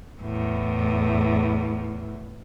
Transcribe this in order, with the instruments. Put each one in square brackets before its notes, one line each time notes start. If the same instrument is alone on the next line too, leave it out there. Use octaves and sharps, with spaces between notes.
[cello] E2 A2